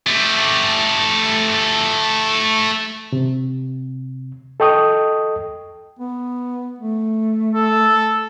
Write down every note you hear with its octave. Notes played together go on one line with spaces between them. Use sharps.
A3 G4
C3
A4 D#5 G5 C#6 D#6
B3
A3
A4